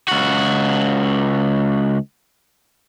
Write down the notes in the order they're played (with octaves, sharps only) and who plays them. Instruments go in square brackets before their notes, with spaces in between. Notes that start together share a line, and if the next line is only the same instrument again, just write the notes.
[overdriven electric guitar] C#2 F#4